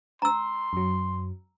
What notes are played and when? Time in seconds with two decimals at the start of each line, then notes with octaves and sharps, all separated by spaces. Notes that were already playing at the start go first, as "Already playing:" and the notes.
0.22 A#5 C6 E6
0.73 F#2 F#3